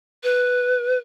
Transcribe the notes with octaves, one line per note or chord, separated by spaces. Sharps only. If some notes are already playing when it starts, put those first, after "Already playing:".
B4